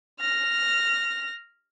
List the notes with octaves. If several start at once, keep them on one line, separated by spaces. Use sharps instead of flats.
F6 A#6